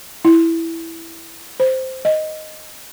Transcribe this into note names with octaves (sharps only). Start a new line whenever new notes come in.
E4
C5
D#5